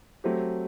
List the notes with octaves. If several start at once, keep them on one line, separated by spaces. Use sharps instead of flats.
F#3 A3 C4 G4